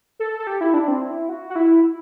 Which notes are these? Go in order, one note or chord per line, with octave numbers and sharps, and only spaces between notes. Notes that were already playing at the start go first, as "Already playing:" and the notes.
A4
A4
G4
E4
D4
C4
E4
F#4
F#4
E4